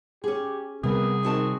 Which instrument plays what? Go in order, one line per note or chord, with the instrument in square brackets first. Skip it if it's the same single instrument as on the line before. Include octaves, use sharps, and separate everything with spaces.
[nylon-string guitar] C#4 G#4 [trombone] G4
[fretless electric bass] C3 G3 [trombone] B3 [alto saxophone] G#4 [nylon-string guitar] A#4
[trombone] D#3 [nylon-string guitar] C4 F#4 A5